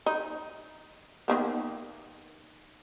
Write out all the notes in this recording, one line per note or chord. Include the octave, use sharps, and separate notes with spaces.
D#4
D#3 A#3 B3